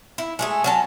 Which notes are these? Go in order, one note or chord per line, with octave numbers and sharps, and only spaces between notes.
E4
G#3 A3 G#4
F#3 C#4 A5